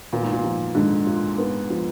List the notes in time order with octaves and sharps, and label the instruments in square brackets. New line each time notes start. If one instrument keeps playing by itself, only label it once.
[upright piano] A#2 [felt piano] B3
[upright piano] G#2
A#2
[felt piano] F3
[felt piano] G#2 [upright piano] D3
[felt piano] F4
B3
F3